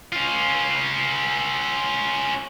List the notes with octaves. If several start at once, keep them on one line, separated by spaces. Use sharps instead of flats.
C#4 F4